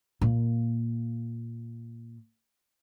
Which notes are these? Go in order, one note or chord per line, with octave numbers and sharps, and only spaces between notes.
A#2 A#3